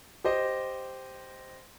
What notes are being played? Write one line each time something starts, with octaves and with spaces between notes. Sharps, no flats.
G4 C5 D#5